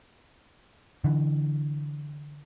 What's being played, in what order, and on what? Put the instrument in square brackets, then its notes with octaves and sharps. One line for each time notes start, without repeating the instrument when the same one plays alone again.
[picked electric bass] D3 E3